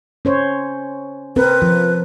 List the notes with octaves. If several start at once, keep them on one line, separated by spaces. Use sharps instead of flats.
C#4 C5 C#5
C4 A#4 B4
F3